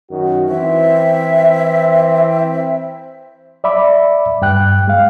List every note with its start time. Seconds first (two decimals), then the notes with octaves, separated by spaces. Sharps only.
0.10 F#2 D#3 F#4
0.49 E3 C4 E5
3.64 D5 E5 B5 D6
4.42 G2 G5 F#6
4.88 G#3 F5